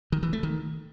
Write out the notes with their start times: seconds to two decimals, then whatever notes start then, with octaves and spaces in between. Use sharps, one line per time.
0.12 D#3
0.23 E3
0.33 A3
0.43 D#3